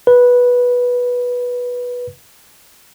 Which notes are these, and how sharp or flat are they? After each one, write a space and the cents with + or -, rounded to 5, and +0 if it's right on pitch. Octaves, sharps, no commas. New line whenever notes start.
B4 -10